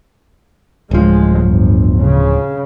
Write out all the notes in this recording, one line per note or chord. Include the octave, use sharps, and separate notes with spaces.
D1 F3 G#3
G1
C#3